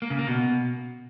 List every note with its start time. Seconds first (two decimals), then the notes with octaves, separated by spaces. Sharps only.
0.02 A#3
0.10 C#3
0.19 A#3
0.27 B2